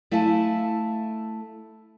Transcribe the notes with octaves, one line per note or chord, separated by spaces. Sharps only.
A3 E4 F5 G#5 A5